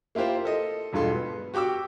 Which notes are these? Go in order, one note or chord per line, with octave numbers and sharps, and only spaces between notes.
A#3 E4 F4 G4 C5
A4 D#5
E1 G2 F4 A4 C6
B3
F#4 G4 G5 D6 E6